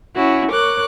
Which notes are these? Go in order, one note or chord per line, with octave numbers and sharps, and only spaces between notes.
C#4 E4 F#4
A#4 C#5 D6 F#6